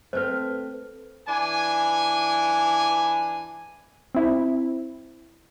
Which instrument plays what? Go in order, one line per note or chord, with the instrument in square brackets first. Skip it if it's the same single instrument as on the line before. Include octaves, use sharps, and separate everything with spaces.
[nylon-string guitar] A3 C4 [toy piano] B4 C5
[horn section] E3 D4 G#5
[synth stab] C4 E4